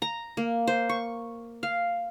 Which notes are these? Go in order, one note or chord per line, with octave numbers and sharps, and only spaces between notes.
A#5
A#3
C5
C#6
F5